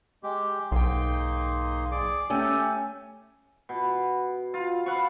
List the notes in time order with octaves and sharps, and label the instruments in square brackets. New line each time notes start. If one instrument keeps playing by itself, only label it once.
[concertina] G#3 G4
[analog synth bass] B1 [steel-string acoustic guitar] G#2 G5 [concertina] A#3 D#4 C6
[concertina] G#4 D5 D6
[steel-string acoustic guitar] A3 C#4 G#5 [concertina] G4 A4
[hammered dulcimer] B2
F4
F5 F#5 B5 C#6